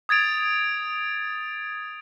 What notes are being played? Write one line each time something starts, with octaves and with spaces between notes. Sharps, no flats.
D#6 G#6 A6 D7 F7